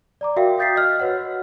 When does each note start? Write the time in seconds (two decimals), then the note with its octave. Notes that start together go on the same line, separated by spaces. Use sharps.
0.21 D5 A#5 D6
0.36 F#4 A#4 E5 F5 G5
0.58 F5 D#6 G6 A6 B6 C7
0.76 D#5 F6
1.00 F#4 B4 C#5 F#5